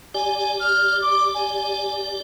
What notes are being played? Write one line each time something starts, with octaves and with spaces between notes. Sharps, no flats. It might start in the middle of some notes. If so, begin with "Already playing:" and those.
G4 D5 G#5
G#5
F6
D6
G#5